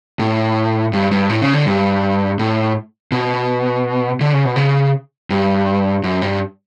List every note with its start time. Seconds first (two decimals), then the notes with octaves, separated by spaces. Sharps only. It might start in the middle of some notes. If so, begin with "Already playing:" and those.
0.19 A2
0.93 G2
1.11 G2
1.29 A2
1.42 C#3
1.53 D3
1.66 G2
2.39 A2
3.12 B2
4.21 D3
4.33 C#3
4.45 B2
4.56 C#3
5.30 G2
6.03 F#2
6.22 G2